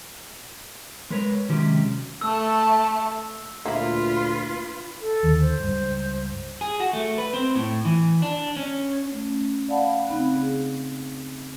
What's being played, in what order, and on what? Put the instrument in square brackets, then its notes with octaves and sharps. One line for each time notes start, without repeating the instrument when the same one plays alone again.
[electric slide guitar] G#3 A#4 B4 C#5
C3 D#3 F#3 G#3 C#4 G4
[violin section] A3 A5 [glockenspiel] E6
[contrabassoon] D2 [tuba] A#2 [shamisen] A#3 E4 [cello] F4 B4
[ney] A4
[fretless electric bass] D#2 D3
[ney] C5
[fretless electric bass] C#2 G2
[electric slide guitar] G#4
F#4
A3
B4
C4
A2
E3
D4
C#4
[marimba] A3 C#4
D5 F5 F#5 A5 B5
C#3 C4 D#4 B5 F#6
G#4